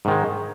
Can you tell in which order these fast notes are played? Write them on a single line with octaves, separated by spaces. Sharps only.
G#2 D#3 G#3